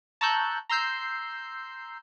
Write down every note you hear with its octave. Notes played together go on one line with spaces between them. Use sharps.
A5 A#5 C#6 E6 F#6 G6
A#5 C6 E6 G6 C7